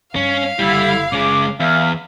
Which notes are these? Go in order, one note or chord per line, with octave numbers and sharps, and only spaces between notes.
G2 C#4 F5
F#1 D3 G3 E4
C#3 G#3 D6
E2 E5 F5